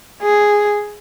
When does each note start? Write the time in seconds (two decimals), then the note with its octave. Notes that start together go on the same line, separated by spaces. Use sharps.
0.22 G#4